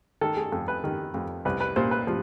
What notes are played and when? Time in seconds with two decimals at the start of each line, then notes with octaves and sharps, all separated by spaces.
0.21 D#3 A4
0.37 G#4
0.52 F2 A4
0.68 B4
0.84 D#3
1.14 F2
1.45 C2 B4
1.60 B4
1.76 A#2 C5
1.91 B4
2.07 F3